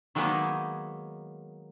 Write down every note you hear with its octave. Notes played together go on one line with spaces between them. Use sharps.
D#3 F#3 G#3 A#3 B3 D#4